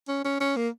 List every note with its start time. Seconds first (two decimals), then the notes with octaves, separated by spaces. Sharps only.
0.08 C#4
0.24 C#4
0.40 C#4
0.56 A#3